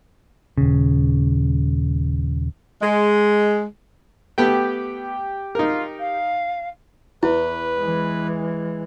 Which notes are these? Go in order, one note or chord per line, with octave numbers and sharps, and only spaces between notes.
D#1 C#3
G#3
A3 B3 G4 G5
D#4 F4 A#4
F5
E2 E4 B4
E3 G#3